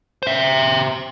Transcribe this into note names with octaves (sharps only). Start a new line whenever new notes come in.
C5 E5